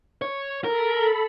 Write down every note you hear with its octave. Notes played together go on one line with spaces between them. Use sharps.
C#5
A4 A#4 B5